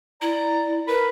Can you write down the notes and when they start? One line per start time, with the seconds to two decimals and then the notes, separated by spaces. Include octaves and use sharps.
0.22 E4 D5 A#5
0.88 A#4 B4 B5